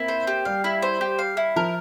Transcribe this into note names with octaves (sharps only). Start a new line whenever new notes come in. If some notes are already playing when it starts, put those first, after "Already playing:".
Already playing: A#3 C4 E4
C5
G4
G3 F5
E4
C5
G4
F5
E4
F3 A#4